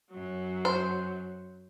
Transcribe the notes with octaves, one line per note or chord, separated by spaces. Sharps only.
F#2 F#3
C5